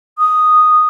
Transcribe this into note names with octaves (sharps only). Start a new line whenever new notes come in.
D#6